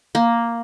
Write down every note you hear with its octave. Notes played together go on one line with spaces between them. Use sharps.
A#3